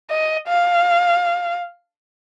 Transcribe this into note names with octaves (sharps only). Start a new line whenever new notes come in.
D#5
F5